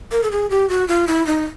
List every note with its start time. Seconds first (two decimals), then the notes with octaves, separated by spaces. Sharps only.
0.12 A#4
0.23 A4
0.31 G#4
0.50 G4
0.70 F#4
0.88 F4
1.08 E4
1.27 D#4